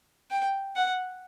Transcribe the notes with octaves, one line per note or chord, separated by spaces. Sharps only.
G5
F#5